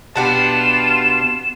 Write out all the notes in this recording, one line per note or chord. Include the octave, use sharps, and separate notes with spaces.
B2 B3 D4 F4 G4 F#5 A5 E7